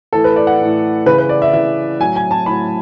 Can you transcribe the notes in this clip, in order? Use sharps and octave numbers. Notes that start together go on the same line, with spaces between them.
A2 E3 A4
B4
D5
F#5
A2 E3
C#3 E3 B4
B4
D5
E5
C#3 E3 E5
A2 F#3 G#5
G#5
A5
A2 F#3 B5